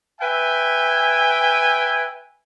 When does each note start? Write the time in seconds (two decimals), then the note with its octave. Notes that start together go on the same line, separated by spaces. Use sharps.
0.21 B4 E5 G5 G#5